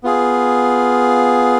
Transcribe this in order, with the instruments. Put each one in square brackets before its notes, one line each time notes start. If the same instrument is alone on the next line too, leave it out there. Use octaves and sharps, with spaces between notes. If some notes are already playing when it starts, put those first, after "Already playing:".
[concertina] B3 F4 G#4